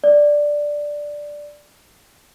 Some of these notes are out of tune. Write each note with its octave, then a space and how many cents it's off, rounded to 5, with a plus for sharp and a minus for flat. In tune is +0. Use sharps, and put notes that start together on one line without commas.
D5 +0